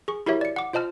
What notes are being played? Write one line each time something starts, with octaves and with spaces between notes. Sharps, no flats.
G#4 C#6
E4 F#4 G4 A#4 C#5 E5
D5 C#7
F#5 D6
F4 C5 D#5 A5 F6